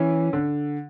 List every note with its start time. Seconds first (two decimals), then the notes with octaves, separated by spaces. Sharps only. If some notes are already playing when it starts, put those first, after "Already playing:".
Already playing: E3 C#4
0.33 D3